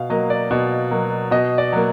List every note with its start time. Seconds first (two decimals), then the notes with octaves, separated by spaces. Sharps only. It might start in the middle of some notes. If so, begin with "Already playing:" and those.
Already playing: B2 F5
0.10 F#3 A#3 D#5
0.30 D5
0.51 B2
0.91 F#3 A#3
1.31 B2 D#5
1.58 D5
1.72 F#3 A#3